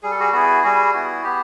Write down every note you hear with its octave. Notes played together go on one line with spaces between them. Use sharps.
G3 G#4
A4
F#4 G#4
B3 E4 F#4 G#4
G3 F#4 G#4
B3 E4 F#4
B3 G4